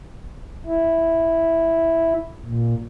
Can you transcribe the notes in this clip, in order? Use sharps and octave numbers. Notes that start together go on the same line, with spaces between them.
E4
A#2